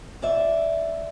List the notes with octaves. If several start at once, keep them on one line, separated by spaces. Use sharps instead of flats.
F2 D5 E5